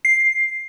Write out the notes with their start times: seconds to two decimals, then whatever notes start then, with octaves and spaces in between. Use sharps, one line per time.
0.05 C7